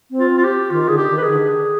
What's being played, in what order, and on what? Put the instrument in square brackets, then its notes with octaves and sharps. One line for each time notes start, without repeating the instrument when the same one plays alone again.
[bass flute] C4
[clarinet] F4
[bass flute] C4
[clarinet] F4
G4
[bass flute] D#3 [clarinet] F4
[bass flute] D3 [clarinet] G#4
[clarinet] G4
[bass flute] D#3
[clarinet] B4
G#4
[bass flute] D3